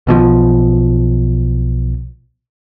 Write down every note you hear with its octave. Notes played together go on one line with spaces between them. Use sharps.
B1 B2 E3 F3